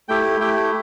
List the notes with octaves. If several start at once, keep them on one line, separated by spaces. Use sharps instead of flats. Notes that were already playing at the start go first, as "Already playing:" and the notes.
A3 E4 G4 G5
A3 E4 G4 G5